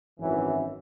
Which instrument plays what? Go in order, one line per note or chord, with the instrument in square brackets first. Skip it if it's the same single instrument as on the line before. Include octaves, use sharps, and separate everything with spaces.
[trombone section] G#1 F#2 E3